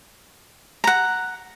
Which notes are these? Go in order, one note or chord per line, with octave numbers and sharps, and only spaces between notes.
F#5 A#5